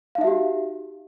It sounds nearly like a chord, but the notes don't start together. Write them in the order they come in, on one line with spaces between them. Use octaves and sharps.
F5 D#4 E5 F#4 G4